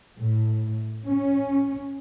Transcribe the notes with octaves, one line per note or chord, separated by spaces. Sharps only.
A2
C#4